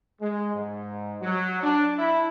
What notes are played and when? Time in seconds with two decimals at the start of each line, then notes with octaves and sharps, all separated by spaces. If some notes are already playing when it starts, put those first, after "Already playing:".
0.21 G#3
0.54 G#2
1.22 F#3
1.63 D4
1.99 E4